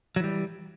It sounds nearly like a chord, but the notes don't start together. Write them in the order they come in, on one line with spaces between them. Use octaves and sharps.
F#3 E3 G3